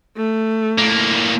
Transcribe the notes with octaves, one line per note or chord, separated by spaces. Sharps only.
A3
A2 A#3